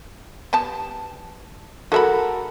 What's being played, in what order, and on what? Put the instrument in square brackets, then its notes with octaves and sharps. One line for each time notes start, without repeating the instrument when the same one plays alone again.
[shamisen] B3 G4 A5
[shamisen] G#3 E5 B5 [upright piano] F#4 A4 A#4